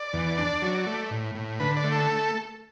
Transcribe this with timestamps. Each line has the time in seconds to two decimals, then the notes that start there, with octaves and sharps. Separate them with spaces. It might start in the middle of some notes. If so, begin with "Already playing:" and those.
Already playing: D5
0.13 E2
0.38 D4
0.62 F#3
0.86 A3
1.11 A2
1.35 A2
1.60 D3 B4
1.77 D5
1.84 A3
1.92 A4